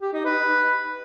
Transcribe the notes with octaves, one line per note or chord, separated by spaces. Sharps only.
G4
D#4
B4